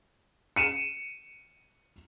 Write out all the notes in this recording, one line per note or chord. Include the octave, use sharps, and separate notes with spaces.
C#7 D#7 E7